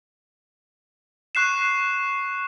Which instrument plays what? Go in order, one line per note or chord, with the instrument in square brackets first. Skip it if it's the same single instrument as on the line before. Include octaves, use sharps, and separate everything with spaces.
[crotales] C#6 F#6 C7 E7